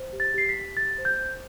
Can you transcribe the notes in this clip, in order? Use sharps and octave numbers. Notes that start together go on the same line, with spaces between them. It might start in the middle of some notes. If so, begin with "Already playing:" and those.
Already playing: C5
G4
A6
G4 C7
B6
G4
G4 A6
C5
G6
C5